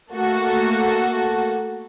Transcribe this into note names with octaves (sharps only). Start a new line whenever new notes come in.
A3 A#3 F#4 A4